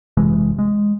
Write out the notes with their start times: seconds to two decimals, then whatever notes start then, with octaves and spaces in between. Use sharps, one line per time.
0.17 F#1 C3 E3 G#3
0.59 G#3